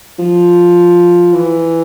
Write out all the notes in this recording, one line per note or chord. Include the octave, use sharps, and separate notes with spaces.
F3
E3